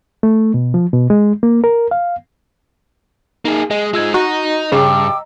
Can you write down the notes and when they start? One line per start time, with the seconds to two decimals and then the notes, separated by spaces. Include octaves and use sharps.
0.23 A3
0.54 B2
0.74 F3
0.93 B2
1.10 G#3
1.43 A#3
1.64 A#4
1.91 F5
3.45 A#3 D#4 G#4
3.71 G#3 G#4 D#5
3.93 G#3 D#4 F4 E6 G#6
4.14 D#4 F#4 D#5 A#5
4.72 G2 C#3 G5 D6 E6